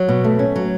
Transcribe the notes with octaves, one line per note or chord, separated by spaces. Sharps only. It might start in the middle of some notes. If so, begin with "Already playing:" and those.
Already playing: F#3
B2
A3
C#4
F#3